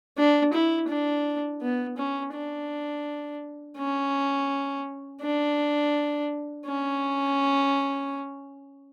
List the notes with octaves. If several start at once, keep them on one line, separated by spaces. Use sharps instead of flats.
D4
E4
D4
B3
C#4
D4
C#4
D4
C#4